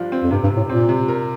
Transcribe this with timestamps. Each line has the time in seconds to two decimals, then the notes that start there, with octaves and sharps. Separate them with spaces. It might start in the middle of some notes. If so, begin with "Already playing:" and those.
Already playing: G2 F3 F4
0.12 C4
0.23 F2
0.31 G2 C3
0.43 G2
0.50 C3
0.57 A2
0.69 A#2 C4
0.89 C3
1.08 A#4